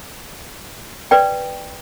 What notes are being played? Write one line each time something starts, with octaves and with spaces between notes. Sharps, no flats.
B4 D5 G5